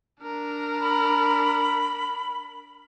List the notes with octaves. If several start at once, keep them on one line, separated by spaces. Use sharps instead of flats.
D4 A#4
B5